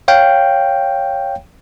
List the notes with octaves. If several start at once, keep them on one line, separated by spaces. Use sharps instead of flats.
C#5 F5 G5